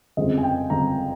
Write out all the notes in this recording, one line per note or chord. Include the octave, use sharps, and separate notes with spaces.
G1 F2 C#3 G#3 C4 D#5
G#5
G5
G1 F2 C#3 G#3 C4 A#5